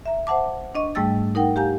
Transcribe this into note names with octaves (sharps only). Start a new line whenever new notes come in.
E5 A#5
C5 E5 F#5 A5 D6
D4 D#5 C#6
G#2 G3 A3 G5 E6 A6
D#4 A#4 F#5 G5
G4 F5 G#5 A#5 G6